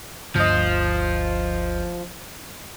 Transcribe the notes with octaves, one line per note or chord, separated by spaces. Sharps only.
G1 D2 F3 D#5